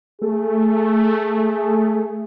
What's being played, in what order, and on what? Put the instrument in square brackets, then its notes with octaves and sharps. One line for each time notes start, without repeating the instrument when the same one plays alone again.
[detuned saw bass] A3 [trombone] G#4